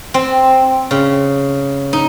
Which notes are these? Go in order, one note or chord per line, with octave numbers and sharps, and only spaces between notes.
C4
C#3
D#4